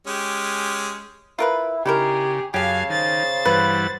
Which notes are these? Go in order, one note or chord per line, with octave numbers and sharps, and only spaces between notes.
G#3 C#4 G4
E4 F4 A#4 B4
C#3 D#4 E4 G4 G#4 A#4
F#2 C#3 G4 G#4 F5 G#5 A5
D#3 C5 A6
G2 E3 B4 F#5